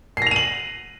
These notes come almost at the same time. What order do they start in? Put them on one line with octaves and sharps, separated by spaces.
C7 A#6 F7 D#7 F#7